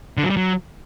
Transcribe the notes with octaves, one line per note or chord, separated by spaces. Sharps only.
D3
F#3
G3
F#3